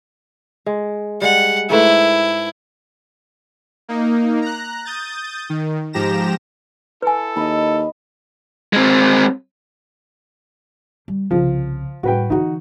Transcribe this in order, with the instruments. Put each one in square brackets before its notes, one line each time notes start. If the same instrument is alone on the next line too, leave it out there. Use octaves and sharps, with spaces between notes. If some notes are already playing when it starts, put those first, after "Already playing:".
[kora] G#3
[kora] G3 G#3 [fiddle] F#5
[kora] G#2 A3 B4 [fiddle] E4
[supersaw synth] A#3 D#4
A#5 F#6
D#6 G6 A6
D#3
G#2 F3 G4 A#5 A#6 E7
[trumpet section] E4 A4 [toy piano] B4 G#5
[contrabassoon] D#2 [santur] D#5 B5
[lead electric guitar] G#3 C4
[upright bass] G3
[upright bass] C2 C#3 [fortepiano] F3
[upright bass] A2 G3 [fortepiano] F#4 B4 G5
[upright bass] D3 E3 [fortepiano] D#4 F#4